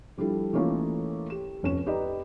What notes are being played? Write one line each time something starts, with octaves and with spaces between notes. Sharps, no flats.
F3 G3 D4 E4 A4
E3 A3 A#3 C#4 D#4 F4
G4 E7
F1 C#4 E7
D#4 G4 B4 D5 D#5 A#5